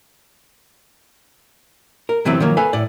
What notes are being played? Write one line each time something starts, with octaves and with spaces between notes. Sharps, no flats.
A#4
C3 E3 F#3 B3 C4
D#3 F3 F#3 A#3
A4 B4 F5 G#5
A2 D5